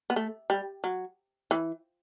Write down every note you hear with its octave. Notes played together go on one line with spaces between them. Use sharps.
B3
A3
G3
F#3
E3